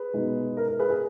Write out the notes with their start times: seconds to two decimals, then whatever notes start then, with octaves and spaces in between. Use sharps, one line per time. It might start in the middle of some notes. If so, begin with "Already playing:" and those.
Already playing: G#4 B4
0.13 B2 G#3 B3 D#4
0.57 A#4
0.68 A#4
0.79 G#4 B4
0.90 G#4